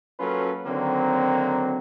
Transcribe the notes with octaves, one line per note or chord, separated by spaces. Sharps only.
F#3 A#3 C#4 F4 A4 B4
D3 D#3 F#3 A#3 C4